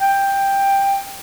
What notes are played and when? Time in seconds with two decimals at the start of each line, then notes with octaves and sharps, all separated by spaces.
0.01 G5